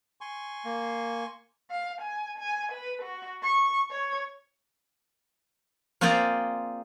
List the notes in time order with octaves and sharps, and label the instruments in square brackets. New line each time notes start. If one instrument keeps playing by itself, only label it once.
[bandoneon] G#5 C6 C#6
[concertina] A#3
[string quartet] F5
G#5
G#5
B4
F#4
C#6
C#5
[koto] A#3 C4 F4 G#4 C5 D5